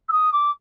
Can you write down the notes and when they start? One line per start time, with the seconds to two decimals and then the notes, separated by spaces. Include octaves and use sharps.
0.09 E6
0.12 D#6
0.32 D6